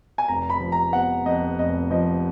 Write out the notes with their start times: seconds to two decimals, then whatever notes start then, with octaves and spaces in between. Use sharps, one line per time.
0.18 G#5
0.28 F1 A#5
0.50 B5
0.60 F3
0.72 A#5
0.93 B3 F#5
1.26 F2 D#5
1.58 F1 D#5
1.90 F3 D#5